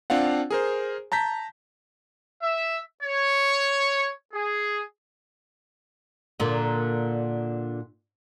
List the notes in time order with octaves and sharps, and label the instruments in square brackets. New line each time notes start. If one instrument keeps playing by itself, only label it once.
[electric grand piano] C4 D4 F4 F5 F#5
G#4 A#4 C5
A5 A#5 G6 B6
[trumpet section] E5
C#5
G#4
[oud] A#2 D3